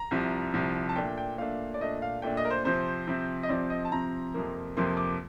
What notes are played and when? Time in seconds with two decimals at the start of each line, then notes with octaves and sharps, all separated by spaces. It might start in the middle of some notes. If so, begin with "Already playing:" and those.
Already playing: A#5
0.11 C2 C3 F3
0.54 C2 C3 F3
0.89 A5
0.96 A#2 A3 D4 G5
1.18 G5
1.38 A#2 A3 D4 F5
1.74 D5
1.81 A#2 A3 D4 D#5
2.02 F5
2.22 A#2 A3 D4 G5
2.37 D#5
2.45 A#4
2.50 C5
2.64 C3 F3 C4 C5
3.07 C3 F3 C4
3.43 D#5
3.49 C3 F3 C4 D5
3.70 D#5
3.85 A5
3.92 C3 F3 C4 A#5
4.34 F2 C3 F3 A#3
4.77 F2 C3 F3 A#3 C6
4.97 D6